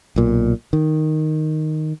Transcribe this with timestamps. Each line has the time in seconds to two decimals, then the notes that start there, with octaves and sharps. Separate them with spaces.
0.16 B1 A#2
0.73 D#3